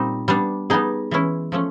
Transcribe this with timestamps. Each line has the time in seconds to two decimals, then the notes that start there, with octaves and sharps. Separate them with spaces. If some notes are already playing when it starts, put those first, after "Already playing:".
Already playing: A#2 G3 C4 D#4
0.28 G3 B3 D4
0.70 G3 B3 D#4 G#4
1.11 E3 G#3 C#4 E4
1.52 F3 A3 C#4